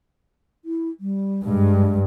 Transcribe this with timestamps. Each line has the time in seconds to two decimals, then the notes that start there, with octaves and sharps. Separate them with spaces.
0.65 E4
1.00 G3
1.45 G2 G#3